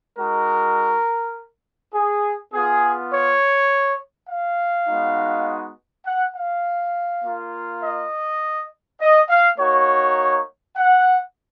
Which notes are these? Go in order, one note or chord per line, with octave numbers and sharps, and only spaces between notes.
G#3 D#4 F#4 A#4
G#4
B3 F4 G#4
C#5
F5
G#3 B3 D#4 F#4
F#5
F5
A#3 F4
D#5
D#5
F5
A#3 D#4 F#4 C#5
F#5